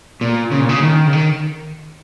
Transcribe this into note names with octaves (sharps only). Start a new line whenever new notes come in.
A#2
C#3
A#2
C#3
D#3
C#3
D#3